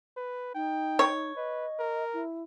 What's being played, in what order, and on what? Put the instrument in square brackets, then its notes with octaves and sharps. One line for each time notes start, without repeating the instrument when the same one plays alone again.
[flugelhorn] B4
[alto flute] D#4 [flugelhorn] G5
[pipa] C#5
[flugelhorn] B4 [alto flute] D#5
[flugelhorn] A#4
[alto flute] E4